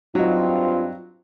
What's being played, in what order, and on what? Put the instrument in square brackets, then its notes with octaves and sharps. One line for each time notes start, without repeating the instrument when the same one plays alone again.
[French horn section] G2 C4 F4 [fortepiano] F#3 D#4